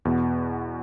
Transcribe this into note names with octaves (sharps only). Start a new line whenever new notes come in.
E2 B2 B3